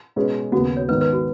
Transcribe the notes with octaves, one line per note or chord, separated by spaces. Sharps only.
B2 G#3 C#4 G#4 B4
D#2 C#3 F#3 B3 F#4
C#5
G#2 D#3 B3 B4
B4
F#4